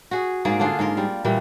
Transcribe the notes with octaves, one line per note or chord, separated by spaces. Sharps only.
F#4 G#4
G#2 A#3 G#4 D5
D3 D4 F4 G#4
G#2 F4 A#4
G3
A#2 E3 G3 A#3